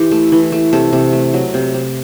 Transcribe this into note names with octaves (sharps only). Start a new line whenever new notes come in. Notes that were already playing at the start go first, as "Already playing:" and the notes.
Already playing: E3 E4 G4
A3
E3
A3
C3 A4
C3
A3
F#3
C3
C3